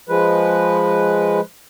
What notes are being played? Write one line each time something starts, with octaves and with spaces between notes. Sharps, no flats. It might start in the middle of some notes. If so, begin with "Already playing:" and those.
F3 G#3 B4